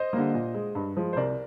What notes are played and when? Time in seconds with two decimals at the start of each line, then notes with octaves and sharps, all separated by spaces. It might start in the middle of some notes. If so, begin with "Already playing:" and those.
Already playing: C5 D#5
0.13 D3 G3 A#3
0.34 A#2
0.54 G#3
0.75 G2
0.97 F3 G#3
1.13 C5
1.16 C2 A#4 D5